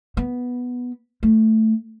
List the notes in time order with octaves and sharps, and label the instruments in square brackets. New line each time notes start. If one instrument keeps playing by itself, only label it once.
[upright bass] B3
A3